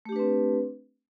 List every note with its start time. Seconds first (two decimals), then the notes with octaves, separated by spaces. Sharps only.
0.05 A3
0.09 G4
0.12 D4
0.16 B4
0.19 C4